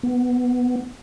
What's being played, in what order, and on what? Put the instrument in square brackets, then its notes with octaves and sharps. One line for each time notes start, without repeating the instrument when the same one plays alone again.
[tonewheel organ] B3